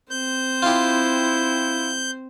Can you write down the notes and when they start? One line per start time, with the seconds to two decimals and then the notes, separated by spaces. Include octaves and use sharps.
0.11 C4 C5 G6
0.62 E4 F4 G4